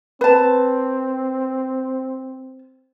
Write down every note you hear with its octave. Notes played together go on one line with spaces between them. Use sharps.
C4 B4 A5